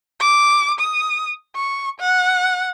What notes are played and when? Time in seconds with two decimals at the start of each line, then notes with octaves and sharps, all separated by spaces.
0.20 D6
0.80 D#6
1.56 C#6
2.00 F#5